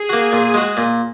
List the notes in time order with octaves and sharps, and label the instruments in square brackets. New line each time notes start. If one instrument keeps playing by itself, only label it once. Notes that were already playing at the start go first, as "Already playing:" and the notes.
Already playing: [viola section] G#4
[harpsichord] A#3 F#4
A#2
G#3 F#4
A#2